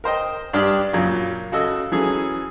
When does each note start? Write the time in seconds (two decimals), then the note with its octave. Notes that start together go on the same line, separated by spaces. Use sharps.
0.04 A#4 C5 D#5 G5
0.53 G2 D4 G4 D5 D#6 F6
0.93 F#2 A#2 C#3
1.52 C#3 F#4 A4 D#5 E6
1.92 E3 F#3 C#4 G#4 A4